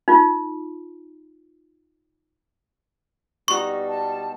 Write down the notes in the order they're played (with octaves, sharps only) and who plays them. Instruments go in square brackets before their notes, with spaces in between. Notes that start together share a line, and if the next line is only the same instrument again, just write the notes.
[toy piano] D#4 F4
[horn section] B2 G3 [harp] D#4 F#4 A#5 [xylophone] C#6
[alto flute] A5